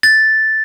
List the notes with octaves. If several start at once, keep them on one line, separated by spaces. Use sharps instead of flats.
A6